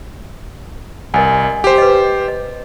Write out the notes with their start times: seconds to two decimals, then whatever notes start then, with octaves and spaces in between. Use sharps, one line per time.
1.14 C2 A#4 D#5 G#5
1.64 G4 C5
1.78 B4 D#5
2.28 D#5